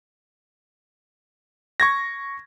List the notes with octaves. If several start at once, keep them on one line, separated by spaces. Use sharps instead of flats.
C#6 G#6 A#6